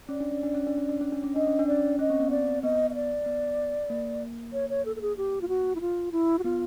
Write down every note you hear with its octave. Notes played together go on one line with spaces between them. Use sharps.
C#4 D5
D4
C#4
D4
C#4
D4
C#4
D4
C#4
D4
C#4
D4 D#5
C#4
D4
C#4 D5
C#4 D#5
C4
B3
C4 D5
B3 D#5
D#5
D5
B3
A#3
C#5
C#5
A4
A4
G#4
G4
F4
F#4
E4
F4
E4
F#4
B3 F4